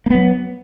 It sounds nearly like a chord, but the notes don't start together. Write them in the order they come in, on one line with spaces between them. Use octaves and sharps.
A#3 B3 F#3